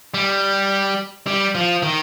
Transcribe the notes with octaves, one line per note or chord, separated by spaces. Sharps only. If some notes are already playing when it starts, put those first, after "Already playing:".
G3
G3
F3
D#3